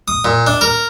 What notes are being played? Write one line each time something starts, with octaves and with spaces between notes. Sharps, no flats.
D#6
A#2
D4
A#4